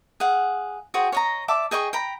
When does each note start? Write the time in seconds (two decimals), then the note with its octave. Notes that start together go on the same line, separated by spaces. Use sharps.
0.20 G#4 F5 F#5
0.94 F#4 G#4 C5 G5
1.12 C#5 D#5 A#5
1.48 D5 E5 A5 D6
1.71 G#4 D#5 G5 C#6
1.93 G5 A#5 B5